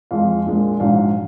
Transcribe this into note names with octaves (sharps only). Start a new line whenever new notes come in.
F2 F3 G#3 F5
A#1 A#2 G#3
A#1 G#2 F#3 F5